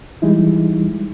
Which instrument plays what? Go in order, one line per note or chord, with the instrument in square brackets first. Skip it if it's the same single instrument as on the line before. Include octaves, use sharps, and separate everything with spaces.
[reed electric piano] E3 G3 G#3 D#4 E4